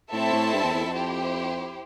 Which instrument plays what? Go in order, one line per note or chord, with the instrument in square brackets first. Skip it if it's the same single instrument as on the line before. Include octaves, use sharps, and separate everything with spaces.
[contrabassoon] A2 [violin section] C4 E4 A4 E5 A5
[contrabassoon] A2
G2
E2
E2
F2
[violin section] E4 G4 C5